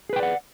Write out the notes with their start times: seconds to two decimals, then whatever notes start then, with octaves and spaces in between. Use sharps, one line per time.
0.10 G#4
0.13 B4
0.16 G5
0.19 D5
0.23 F#5